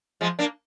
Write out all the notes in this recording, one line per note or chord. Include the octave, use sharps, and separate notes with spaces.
F3 G#3
A#3 D4